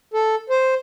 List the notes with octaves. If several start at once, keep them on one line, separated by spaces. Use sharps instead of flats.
A4
C5